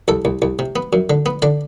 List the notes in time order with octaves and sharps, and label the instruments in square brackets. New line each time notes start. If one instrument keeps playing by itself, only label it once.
[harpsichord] C2 A4
C2
C2
C3
B3
F#2
D3
B3
D3 D5